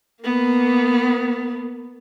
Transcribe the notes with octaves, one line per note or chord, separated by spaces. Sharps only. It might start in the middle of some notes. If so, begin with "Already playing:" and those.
A#3 B3